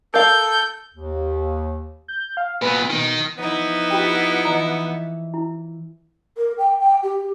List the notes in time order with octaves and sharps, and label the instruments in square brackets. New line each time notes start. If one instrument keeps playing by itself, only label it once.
[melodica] A4 [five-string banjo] A#4 F5 [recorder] G6
[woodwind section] D#2
[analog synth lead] G6
F5
[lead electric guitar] A#2 B3 [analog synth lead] B4
[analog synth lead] B2 [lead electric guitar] D#3
[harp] F3 [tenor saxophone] B3 [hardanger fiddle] D#4 E4
[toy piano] F4 G4 G5
[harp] E3 [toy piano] D#5 A#5
[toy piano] E4
[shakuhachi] A#4
G5
G5
G4